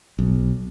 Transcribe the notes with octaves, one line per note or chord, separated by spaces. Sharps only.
B1